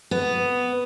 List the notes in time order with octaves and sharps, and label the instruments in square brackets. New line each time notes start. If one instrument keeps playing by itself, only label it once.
[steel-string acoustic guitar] B3